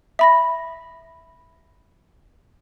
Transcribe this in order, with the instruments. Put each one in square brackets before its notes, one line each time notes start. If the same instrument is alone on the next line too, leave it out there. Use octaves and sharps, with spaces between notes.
[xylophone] E5 B5 A#6